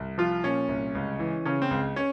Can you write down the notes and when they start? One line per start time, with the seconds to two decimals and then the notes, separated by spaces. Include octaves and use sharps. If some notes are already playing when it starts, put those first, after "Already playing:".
Already playing: C2
0.18 F3 F4
0.43 A#2 C#4
0.68 C2
0.95 C#2
1.19 E3
1.45 C#3 C#4
1.62 C4
1.71 C#2
1.96 C#4